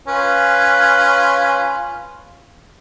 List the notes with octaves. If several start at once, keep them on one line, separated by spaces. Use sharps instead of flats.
C#4 F4 B4